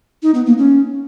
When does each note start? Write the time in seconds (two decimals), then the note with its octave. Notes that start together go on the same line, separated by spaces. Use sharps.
0.23 D#4
0.34 B3
0.46 A#3
0.58 C#4